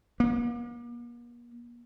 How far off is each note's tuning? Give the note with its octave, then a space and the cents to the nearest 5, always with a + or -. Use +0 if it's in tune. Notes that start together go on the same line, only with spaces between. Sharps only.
A#3 +45